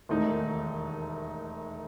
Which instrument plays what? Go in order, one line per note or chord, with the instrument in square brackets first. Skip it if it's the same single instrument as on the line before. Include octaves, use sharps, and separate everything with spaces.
[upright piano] E1 D#2 D#3 A3 D#4